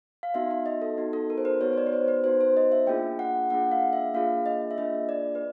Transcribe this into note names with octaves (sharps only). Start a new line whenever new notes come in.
F5
B3 D#4 F#4 E5
E5
D#5
A4
B3 D#4 F#4
A4
A#4
C5
B4
B3 D#4 F#4 C#5
C#5
D5
B4
C5
B4
B3 D#4 F#4 C5
C5
D#5
E5
A#3 D4 F4 G#4 G5
F#5
A#3 D4 F4 G#4 F#5
F5
E5
A#3 D4 F4 G#4 F5
D#5
E5
A#3 D4 F4 G#4 D#5
D5
B4